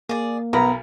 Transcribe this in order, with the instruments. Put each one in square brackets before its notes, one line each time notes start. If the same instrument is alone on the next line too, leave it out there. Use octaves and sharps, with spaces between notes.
[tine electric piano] A#3 [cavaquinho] G#4 D5
[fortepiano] B1 A#4 B5 [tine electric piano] B3 [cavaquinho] A#5